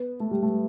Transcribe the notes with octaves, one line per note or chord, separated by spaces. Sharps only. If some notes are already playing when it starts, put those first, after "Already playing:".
Already playing: B3
A3
G3
A3